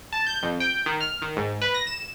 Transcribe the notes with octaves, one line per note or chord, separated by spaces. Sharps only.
A5
G6
F2
G5
D#3
F6
D#3
G#2
B4
A#6
E7